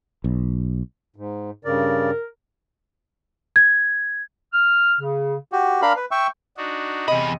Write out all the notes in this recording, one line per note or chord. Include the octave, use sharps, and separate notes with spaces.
B1
G#2
G2 C#3 A#4 D5
G#6
F6
C#3
F#4 G4
D4 A#4 F5 B5
B4
E5 G5 C#6
D4 D#4 F#4
E2 C3 D#5 B5